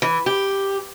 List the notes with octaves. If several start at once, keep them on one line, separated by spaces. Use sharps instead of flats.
E3
G4